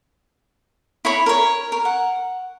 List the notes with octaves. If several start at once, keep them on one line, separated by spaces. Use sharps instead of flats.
E4 C#5 B5
A#4 C#5
A#4
F#5